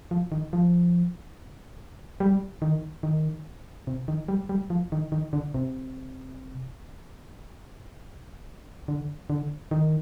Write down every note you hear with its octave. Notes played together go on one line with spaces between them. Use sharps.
F3
D#3
F3
G3
D#3
D#3
C3
D#3
G3
G3
F3
D#3
D#3
D3
C3
D3
D3
D#3